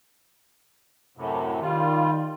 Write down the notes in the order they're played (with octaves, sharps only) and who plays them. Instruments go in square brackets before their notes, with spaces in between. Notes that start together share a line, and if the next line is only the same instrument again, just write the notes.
[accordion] F#2 A2 C3
[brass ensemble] D#3 [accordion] G3 F4